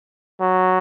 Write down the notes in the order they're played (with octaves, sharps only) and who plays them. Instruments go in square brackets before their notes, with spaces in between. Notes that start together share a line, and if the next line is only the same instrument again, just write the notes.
[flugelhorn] F#3